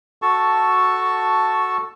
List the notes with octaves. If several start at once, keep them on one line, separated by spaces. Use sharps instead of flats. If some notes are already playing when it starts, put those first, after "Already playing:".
F#4 A4 A5 C#6